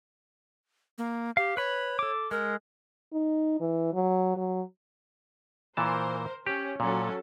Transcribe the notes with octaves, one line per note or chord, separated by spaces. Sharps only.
A#3
G4 F5
B4 C#5 B5
A4 D6
G#3 A#4
D#4
E3
F#3
F#3
A#2 E3 A#4 C5 A5
C#4 G4
A#2 F#3 C#4 A4